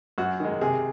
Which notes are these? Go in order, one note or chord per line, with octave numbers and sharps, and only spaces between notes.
F#2 F#4
D#3 G#3
C3 G#4